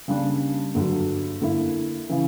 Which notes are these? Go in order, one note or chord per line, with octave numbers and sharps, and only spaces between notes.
C#3 G3 A#3 D4
G2 D3 F#3
D3 A#3 E4
C#3 E3